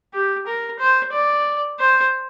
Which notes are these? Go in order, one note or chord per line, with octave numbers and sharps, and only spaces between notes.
G4
A#4
C5
D5
C5